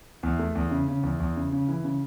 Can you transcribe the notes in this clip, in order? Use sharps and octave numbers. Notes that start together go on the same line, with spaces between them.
E2
A3
E2
C#3
C#3
E2
E2
C#3
C#3
E3
C#3